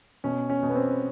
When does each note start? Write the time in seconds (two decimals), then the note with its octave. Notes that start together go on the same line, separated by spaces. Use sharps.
0.24 B2 C#4
0.49 C#4
0.63 B2
0.69 B3
0.75 C4